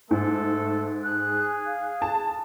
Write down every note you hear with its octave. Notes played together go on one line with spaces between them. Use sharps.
G#2 A3 A4
G#4 F#6
F5
A5